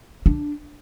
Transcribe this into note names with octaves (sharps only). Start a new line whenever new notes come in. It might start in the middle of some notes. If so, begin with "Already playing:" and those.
D4